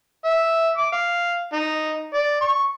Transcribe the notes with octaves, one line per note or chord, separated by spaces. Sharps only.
E5
D6
F5
D#4
D5
C#6